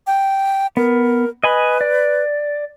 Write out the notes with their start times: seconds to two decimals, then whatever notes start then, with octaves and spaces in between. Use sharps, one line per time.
0.07 G5
0.77 B3 A#4
1.44 B4 D#5 G#5 B5
1.81 D5